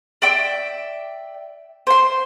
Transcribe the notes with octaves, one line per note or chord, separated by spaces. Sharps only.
D5 E5 G5 E6
C5 C6